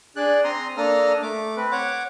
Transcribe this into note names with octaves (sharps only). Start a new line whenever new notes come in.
D4 G#4 D5 F#6
C4 A#5 C6 D#6
A#3 D4 A4 A#5 D#6 F6
A3 D6
C4 B4
C#5 F#5 D6